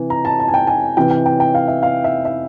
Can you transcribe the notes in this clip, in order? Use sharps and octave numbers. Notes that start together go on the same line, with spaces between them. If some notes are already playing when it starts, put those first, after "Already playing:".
Already playing: C3 E3
A#5
A5
A5
G#5
G5
G#5
C3 E3 G5
G5
G5
G5
F5
E5
F5
E5
E5